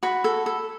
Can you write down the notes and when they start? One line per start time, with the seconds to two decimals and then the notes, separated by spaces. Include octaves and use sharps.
0.03 F#4 B5
0.24 A4
0.46 A4